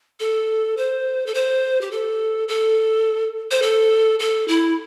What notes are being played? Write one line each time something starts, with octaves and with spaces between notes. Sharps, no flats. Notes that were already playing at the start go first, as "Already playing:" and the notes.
A4
C5
A4
C5
G4
A4
A4
C5
A4
A4
E4